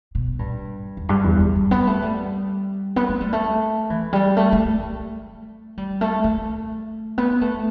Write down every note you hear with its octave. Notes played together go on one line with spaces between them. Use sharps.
B2
G2
E2
G2
E2
G3
G3
B3
A3
G3
B3
A3
G3
A3
E3
G3
A3
A3
A3
G3
A3
A3
B3
A3